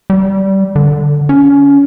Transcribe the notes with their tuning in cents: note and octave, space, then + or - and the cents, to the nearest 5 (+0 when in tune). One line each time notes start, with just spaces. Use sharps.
G3 -20
D3 +10
C#4 +25